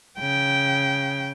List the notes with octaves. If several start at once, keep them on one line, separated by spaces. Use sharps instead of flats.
C#3 G5